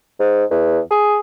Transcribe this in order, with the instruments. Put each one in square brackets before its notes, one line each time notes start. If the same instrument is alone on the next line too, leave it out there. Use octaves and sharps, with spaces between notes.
[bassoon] G#2
E2
G#4